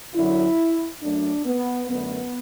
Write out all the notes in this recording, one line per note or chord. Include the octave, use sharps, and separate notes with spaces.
F#2 D3 F#3 E4
F#2 F#3 A3 D4
B3
F#2 D3 A3 B3